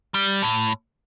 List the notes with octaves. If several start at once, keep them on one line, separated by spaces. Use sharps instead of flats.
G3
A2